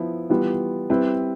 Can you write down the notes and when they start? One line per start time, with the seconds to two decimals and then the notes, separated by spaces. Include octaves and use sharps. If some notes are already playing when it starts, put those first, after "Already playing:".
Already playing: F3 B3 E4
0.30 E3 G3 B3 F4
0.90 G3 C4 E4 B4